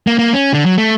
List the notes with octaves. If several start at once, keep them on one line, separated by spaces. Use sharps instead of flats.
A#3
A#3
C#4
D3
F#3
A3